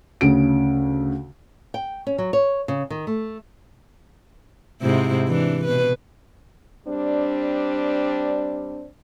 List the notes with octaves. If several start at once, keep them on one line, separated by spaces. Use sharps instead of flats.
D2 C#3 D7
G5
C#4
F#3
C#5
C#3
D#3
A3
G#2 C3 E4
E3 D4
B2 B4
G3 C4 D4